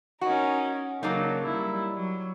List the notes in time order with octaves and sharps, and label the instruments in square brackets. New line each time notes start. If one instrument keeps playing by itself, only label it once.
[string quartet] C#4 D#4 A#4 [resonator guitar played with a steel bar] F#4
[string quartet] C#3 F#3 [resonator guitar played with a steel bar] A#3 D4 D#4
[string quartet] G3 E4
F#3